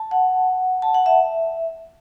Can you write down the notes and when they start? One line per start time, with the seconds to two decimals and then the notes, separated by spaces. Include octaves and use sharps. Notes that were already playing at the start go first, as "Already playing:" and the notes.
Already playing: A5
0.11 F#5
0.82 A5
0.94 F#5
1.06 E5